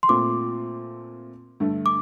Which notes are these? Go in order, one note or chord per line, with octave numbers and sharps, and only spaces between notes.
C6
A#2 A3 C4 F4 D6
G2 D3 A3
D6